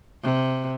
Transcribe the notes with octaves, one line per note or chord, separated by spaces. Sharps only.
C3